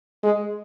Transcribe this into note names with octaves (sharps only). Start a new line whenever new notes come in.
G#3